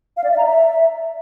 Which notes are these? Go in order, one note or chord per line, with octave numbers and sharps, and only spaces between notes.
F5
D5
E5
A#5
E5